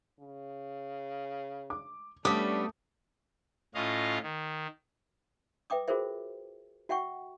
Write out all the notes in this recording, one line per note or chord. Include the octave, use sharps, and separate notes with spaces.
C#3
D6
G3 A3 B3 C#4 D4 D6 D#6
A2 C#4 F4 D#5 F5
D#3
B4 E5 G5 D6 D#6
F4 F#4 G#4 A#4 C5 E5
F#4 E5 F#5 G5 C#6